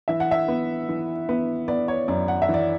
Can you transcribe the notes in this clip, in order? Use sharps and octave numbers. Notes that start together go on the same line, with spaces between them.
E3 E5
F#5
E5
B3
E3
B3
B3 D5
C#5
F#2 D5
F#5
E5
E3
D5